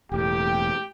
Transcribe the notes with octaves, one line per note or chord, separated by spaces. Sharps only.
E1 A2 G4 G5